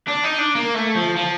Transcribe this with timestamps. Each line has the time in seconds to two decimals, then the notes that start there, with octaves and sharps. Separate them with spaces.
0.08 D4
0.24 D#4
0.39 D4
0.55 A#3
0.75 A3
0.95 F3
1.16 F3